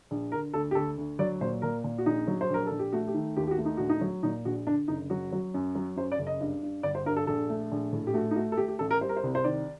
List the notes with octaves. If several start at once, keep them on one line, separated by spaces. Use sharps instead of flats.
A#1
D3 A#4
D2 A4
G4
D2 A4
D2
F#3 D5
A#2 C5
A#2 A#4
A#2
F#4
A#1 D#4
F#3
C5
A#1 A#4
A#1 A4
G4
A3 F#4
G4
D#3
D#2 G4
G4
F#4
A3
D#4
A#1 F#4
D#4
F#3
A#2 D#4
A#1 F#4
D3 D4
F#1 D#4
F#3 F#4
F#3
F#2
F#3
F#2 C5
D5
F#1
D#5
G2
G2
G1 D5
C5
G2 A#4
A4
A#1 A4
A3
A#1
A2
G4
A3 F#4
D#4
A3 F#4
A4
A3 G4
G4
A1 A4
A#4
G3 C5
A#4
C5
C2
C5
D#3 D5